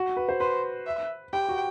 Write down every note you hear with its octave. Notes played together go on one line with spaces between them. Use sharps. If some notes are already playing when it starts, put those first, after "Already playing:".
Already playing: F#4
B4
C5
B4 C5
E5
G4 G5
F#4